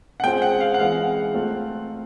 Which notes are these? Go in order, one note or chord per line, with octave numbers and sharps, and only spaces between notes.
F#5
G#3 C4 F4 G#4 C5 G5
F#5
F5
F#5
E3 G#3 C4 F5
A3 C4 F4